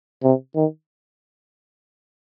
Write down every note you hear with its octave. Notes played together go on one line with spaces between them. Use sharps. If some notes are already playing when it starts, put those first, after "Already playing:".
C3
D#3